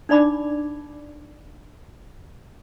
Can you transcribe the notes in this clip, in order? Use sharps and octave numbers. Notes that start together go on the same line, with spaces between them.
D4 D#4 D5 B5 D6